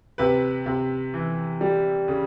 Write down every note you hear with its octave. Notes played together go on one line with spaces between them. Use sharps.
C3 B4
C3
E3
G3
C#3